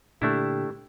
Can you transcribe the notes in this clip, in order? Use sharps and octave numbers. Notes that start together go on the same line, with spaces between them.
A#2 D3 A3 D4 E4 G4